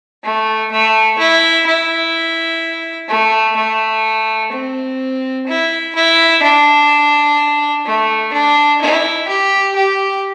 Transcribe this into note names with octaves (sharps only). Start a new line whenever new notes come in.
A3
A3
E4
E4
A3
A3
C4
E4
E4
D4
A3
D4
E4
G4
G4